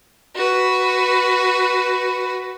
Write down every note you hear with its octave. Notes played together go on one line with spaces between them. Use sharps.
F#4 B4